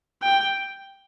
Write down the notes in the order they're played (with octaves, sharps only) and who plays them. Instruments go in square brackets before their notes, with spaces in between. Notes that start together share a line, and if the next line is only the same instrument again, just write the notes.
[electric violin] G5